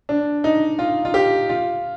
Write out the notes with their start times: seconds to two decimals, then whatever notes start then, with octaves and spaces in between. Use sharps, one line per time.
0.09 D4
0.44 D#4
0.79 F4
1.05 F4
1.14 G4
1.49 F4